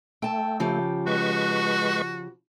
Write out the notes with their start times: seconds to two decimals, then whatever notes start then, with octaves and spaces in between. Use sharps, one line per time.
0.22 A3 G5 A5
0.60 C#3 F3 G4
1.07 G#3 F#4 B4 C#6